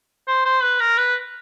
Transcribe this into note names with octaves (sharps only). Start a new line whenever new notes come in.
C5
C5
B4
A#4
B4